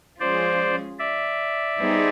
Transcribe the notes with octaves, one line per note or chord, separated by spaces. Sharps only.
F3 G#3 C#4 F4 G#4 C5 D5
D5 E5
G3 B3 D#4 G#4 C5